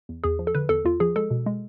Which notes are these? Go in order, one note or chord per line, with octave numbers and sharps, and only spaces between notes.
E2
E2 G#4
F3
A4
D3 B4
E2 A4
E2 F4
F3 G#4
G#3 A4
B2
G#3